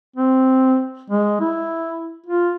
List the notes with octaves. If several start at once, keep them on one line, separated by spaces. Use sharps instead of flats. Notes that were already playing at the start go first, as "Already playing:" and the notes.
C4
G#3
E4
F4